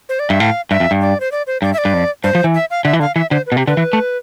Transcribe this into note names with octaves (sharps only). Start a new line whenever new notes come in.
C5
D5
G2 E5
A2 F5
G2 E5
F2
G2
D5
C5
D5
C5
G2 D5
E5
D5
G2
F2
G2 C5
F3
E3
E5
F5
D3 E5
E3
D3 F5
E3 E5
D3 C5
B4
B2
C3 G4
D3 B4
E3
A3